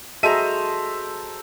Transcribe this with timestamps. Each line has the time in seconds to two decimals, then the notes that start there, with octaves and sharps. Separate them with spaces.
0.23 F#4 G#4 A4 C5 D#5 E5 A#5 D#7